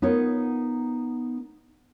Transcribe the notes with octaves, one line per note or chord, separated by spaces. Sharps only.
B3 D#4 F4 A#4 C#5